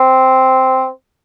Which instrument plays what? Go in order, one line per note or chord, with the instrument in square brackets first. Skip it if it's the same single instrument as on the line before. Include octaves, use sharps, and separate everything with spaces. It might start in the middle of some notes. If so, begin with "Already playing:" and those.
Already playing: [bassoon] C4